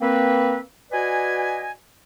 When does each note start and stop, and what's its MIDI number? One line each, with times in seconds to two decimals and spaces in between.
0.01 0.58 58
0.01 0.58 60
0.01 0.58 71
0.92 1.71 66
0.92 1.71 71
0.92 1.71 74
0.92 1.71 75
0.92 1.71 80